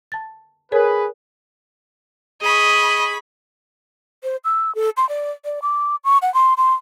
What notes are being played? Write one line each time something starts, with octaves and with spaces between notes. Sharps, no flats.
A5 A6
G#4 A#4 B4 C#5
G#4 D#5 B5 C#6
C5
E6
A4
C6
D5
D5
D6
C#6
F#5
C6
C6